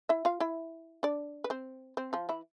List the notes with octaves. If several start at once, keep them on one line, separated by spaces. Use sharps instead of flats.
E4 E5
F4 F5
E4 E5
D4 D5
B4
C4 C5
C4 C5
F3 F4
E3 E4